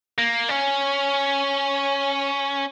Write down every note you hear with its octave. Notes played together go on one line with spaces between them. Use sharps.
A#3
C#4